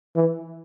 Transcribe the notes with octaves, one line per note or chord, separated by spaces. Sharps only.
E3